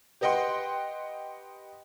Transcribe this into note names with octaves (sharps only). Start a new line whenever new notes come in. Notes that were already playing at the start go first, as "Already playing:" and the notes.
G4 B4 D#5 F#5 G5 C6